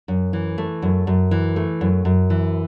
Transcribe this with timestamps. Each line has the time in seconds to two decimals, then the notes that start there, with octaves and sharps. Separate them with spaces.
0.08 F#2
0.33 E3
0.58 A3
0.82 F#2
1.07 F#2
1.31 E3
1.56 A3
1.81 F#2
2.05 F#2
2.30 E3